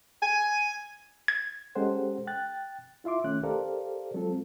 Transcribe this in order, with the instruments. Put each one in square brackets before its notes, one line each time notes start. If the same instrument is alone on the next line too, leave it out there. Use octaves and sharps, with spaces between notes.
[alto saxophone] G#5
[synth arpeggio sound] G#6
[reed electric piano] G#3 C#4 G4 A4 C5 F#5
G5 F#6 A6
E4 F4 E5 C6 D6
C2 D#3 A3 C#4 F#6
G4 A4 A#4 C5 D5 F5
F#3 G#3 C4 F4 A4